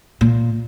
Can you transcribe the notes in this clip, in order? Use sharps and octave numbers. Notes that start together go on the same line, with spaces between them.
A#2